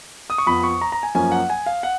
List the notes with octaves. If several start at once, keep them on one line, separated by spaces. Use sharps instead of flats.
D#6
C#6
F2 F3 B3 B5
C#6
A#5
A#5
G#5
F#2 F3 A#3 C#4 G#5
F#5
G#5
F5
F#5